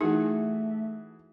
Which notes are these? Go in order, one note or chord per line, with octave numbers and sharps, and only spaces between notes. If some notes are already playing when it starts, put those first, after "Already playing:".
E3 A3 D#4 F#4 G#4